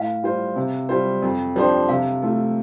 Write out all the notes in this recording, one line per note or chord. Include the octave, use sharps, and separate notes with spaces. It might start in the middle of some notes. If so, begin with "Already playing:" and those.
Already playing: A2 F5
G3 F4 C5
C3
G3 F4 C5
F2
F3 D4 G4 C5
C3 F5
A3 F4